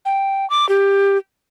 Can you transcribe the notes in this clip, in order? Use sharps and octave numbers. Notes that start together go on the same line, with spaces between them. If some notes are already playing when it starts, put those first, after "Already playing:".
G5
D6
G4